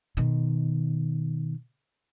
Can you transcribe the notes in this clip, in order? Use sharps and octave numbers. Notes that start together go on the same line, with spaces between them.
B2 D#3